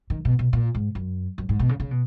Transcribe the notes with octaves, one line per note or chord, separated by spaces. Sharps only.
D#3
B2
B2
A#2
G#2
F#2
F#2
G#2
B2
C#3
C#3
B2